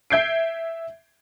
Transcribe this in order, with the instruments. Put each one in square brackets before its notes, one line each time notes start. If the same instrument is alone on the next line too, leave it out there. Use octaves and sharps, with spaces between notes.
[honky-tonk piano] E5 G6 G#6 C7 D7